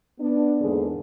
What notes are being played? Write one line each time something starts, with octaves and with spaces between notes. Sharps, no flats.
B3 D4
E2 G#2 D3 A#3 G#4 A#4